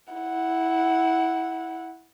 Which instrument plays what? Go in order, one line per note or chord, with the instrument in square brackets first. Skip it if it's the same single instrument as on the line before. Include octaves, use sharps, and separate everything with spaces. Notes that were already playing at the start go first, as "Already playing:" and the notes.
[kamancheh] E4 F#5